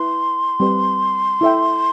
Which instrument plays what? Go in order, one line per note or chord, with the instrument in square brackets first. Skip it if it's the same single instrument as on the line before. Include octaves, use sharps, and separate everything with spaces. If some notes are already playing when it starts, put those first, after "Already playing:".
Already playing: [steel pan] E4 B4 [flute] C6
[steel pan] G3 C4 G4 B4
E4 A4 E5 G5